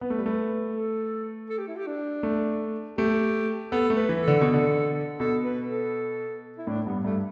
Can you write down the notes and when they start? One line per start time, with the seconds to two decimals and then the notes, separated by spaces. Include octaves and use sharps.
0.01 B3 B4
0.10 A3
0.18 G3
0.26 A3
0.76 A4
1.49 A4
1.58 G4
1.68 E4
1.77 G4
1.87 D4
2.23 A3
2.98 A3 G4
3.72 B3 A4
3.90 A3
3.96 B4
4.09 E3
4.21 A4
4.27 D3
4.41 B2
4.54 D3
5.20 B2 A4
5.44 B4
5.69 A4
6.58 E4
6.67 A2 D4
6.86 G2 B3
7.04 G2 A3